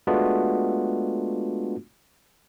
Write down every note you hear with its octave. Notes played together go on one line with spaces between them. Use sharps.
G#3 A3 B3 D4 F4 F#4